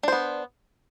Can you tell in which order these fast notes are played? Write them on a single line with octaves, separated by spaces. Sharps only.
D4 C5 B3